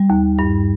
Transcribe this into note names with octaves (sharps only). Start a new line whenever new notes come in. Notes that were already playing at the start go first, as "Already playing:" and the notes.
Already playing: G3
D#2
G2